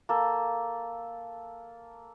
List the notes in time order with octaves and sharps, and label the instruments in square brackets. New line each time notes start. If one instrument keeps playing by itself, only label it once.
[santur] A#3 A4